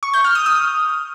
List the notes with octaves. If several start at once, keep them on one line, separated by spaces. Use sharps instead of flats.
C#6
G6
F6
D#6
D#6